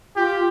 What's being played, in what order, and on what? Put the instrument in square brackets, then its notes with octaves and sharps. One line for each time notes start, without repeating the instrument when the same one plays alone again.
[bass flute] F4 [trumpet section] G4